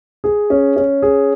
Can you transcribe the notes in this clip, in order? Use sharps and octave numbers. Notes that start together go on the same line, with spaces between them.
G#4
C#4
C#4
G#4